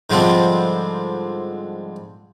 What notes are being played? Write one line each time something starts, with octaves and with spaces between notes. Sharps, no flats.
G#2 D3 F3 G3 C4